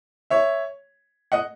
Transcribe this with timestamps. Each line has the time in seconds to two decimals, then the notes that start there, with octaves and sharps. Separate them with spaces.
0.30 C#5 E5
1.32 D#5 F#5